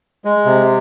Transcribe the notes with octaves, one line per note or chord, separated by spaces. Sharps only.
G#3
C3